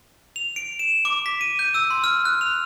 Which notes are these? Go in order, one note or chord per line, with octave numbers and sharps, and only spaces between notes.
F7
D7
E7
D6
B6
D#7
G6
E6
C6
F6
F#6
F7